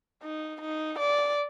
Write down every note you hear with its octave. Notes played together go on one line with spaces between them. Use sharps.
D#4
D#4
D5